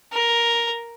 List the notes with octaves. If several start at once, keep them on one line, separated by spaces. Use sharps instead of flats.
A#4